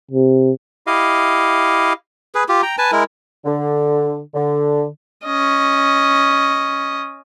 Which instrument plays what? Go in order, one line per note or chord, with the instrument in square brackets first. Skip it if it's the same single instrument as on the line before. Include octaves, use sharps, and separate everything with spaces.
[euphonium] C3
[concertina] E4 G4 D#5 F5
[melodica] G#4 B4
F4 G4
G5 A#5
B4 G#5 A5
G#3 E4 A#4
[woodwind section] D3
D3
[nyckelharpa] C#4 D#5